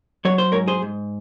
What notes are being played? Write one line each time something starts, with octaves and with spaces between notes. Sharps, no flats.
F#3 C#5
C5
G#2 A#4 C#5
G#4 C5
G#2